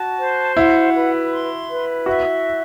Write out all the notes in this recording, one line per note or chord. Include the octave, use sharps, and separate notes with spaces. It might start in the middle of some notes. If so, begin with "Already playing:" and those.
Already playing: F#4 A5
C5
E4 F#5
B4
C6
B4
F#4 E5